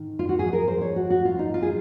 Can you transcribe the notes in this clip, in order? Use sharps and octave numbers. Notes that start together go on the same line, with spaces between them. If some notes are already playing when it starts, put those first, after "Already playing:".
Already playing: G#2 D#3
F4
F#4
G#2 F3 G#4
A#4
C5
C#5
F#4
F#4
F4
D#4
F4
G#4